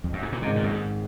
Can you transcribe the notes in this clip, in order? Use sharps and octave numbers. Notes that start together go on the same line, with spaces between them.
F2
F#2
G#2
A#2
G#1 G#2 C3 D#3 G#3
A#2
F#2
G#2